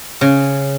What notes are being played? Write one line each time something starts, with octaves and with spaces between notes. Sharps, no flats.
C#3